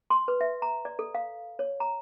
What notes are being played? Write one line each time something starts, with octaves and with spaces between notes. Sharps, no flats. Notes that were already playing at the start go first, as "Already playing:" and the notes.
C6
B4
E5
A#5
D5
A4
F5
C#5
A#5